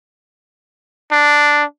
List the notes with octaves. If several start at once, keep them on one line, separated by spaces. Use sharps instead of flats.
D4